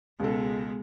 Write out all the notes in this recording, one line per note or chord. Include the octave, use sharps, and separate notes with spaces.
C#2 B2 G#3 A4